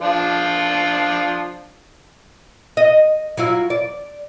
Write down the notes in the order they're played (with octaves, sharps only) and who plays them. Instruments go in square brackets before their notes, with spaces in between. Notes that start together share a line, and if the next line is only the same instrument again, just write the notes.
[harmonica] F3 D4 F4
[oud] D#5
F#3 E4 F4
D5